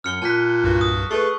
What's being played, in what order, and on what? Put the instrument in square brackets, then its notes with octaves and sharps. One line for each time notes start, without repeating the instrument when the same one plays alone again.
[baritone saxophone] F#2 [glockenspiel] F6 C#7 G7
[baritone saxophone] A#2 [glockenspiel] A5 F#6 B6
[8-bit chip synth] C2 G2 F#4
[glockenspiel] D#6
[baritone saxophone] A3 [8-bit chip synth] G#4 B4 [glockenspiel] C#6